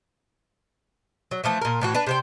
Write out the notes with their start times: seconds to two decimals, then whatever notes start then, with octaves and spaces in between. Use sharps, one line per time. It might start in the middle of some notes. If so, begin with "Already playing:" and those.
1.31 F#3
1.44 E3 F3 A3
1.61 A#2 A#4
1.81 A2 E3 F#4
1.94 D4 B4
2.07 C3 C5 G5